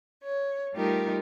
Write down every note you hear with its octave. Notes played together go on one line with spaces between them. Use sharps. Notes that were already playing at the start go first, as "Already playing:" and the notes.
C#5
G3 A3 D#4 F4 G4 A#4